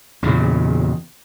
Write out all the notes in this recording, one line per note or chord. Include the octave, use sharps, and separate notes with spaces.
E2 A#2 C#3